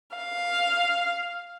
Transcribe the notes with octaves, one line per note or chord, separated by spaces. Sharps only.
F5